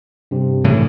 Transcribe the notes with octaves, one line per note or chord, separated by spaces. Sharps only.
G2 C3
A2 C#3 E3